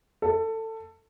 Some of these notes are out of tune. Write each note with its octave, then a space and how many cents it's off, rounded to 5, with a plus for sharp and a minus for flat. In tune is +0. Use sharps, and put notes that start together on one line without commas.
A4 +20